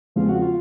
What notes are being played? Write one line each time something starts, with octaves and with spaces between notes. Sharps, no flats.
E2 C#3 F3 G#3 C4 F4
F#4
F4